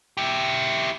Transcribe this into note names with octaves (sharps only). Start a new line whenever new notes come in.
E4 G4